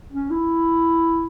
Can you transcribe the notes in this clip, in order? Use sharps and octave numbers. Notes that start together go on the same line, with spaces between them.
C#4
E4